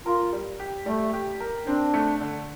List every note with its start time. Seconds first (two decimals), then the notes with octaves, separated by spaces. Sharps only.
0.06 F4 A#4
0.33 G3
0.59 G4
0.86 G3 A3
1.13 G4
1.40 A#4
1.67 C4 D4
1.94 A3
2.20 D3